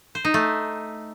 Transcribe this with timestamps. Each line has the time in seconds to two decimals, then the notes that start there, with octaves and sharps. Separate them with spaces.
0.15 C5
0.25 D#4
0.34 A3